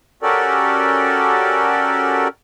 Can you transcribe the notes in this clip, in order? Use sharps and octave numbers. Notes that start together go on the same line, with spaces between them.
C#4 F#4 G4 A4 A#4 D5